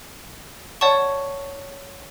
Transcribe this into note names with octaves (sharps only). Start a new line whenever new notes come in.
C#5 D5 F#5 A5 C#6